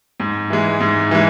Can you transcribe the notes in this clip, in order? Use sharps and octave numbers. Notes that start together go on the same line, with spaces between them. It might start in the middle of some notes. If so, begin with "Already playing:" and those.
G#2
E3 G#3
G#2
E3 G#3